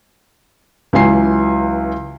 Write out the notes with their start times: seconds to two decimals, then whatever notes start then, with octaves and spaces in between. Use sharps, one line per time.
0.93 C#2 E3 F#3 G#5 C7